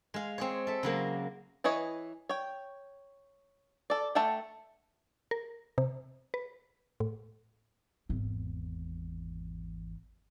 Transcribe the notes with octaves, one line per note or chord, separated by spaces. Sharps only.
G#3 F5
C4 G#4 C#5
A4 E5
C#3 F#3 A#3
E3 E4 B4 C#5 D#5
C#5 G5
A4 D5
A3 A4 E5 F#5 G5
A#4
C3
B4
A2
G#1 E2